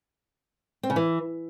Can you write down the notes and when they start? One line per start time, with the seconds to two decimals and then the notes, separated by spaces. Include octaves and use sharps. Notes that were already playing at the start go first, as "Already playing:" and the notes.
0.83 C4
0.90 C#3
0.96 E3